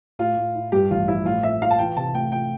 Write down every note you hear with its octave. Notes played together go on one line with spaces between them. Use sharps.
A2 F4
A2
E4
G2 G4
A1 F4
F3 E4
A2 F4
C4 E5
F4 F5
A5
E3 G5
C3 A5
A3 G5
G5